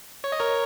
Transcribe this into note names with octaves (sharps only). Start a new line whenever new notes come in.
C#5
D#5
A#4 C#5